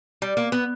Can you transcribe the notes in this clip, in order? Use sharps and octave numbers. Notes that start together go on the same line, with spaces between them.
G3
A#3
B3